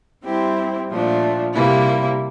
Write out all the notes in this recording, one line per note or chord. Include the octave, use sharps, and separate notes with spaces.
G3 C4 E4 G4 C5
A#2 F3 A3 D4
C3 G3 A#3 E4